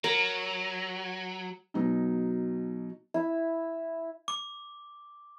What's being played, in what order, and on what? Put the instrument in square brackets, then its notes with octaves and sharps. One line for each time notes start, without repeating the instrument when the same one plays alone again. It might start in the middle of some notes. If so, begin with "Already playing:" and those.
[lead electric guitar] F#3 [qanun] A#4 A#5
[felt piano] B2 F#3 D#4
[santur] E4
[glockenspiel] D6